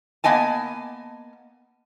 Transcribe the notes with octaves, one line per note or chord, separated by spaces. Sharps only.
A#3 B3 D#5 G#5 A5